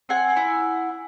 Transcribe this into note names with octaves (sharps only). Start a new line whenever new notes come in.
C4 F#5 G#5
E4